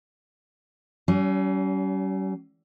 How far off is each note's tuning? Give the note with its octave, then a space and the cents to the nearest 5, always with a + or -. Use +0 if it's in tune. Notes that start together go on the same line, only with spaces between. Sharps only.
G3 -45 C#4 +30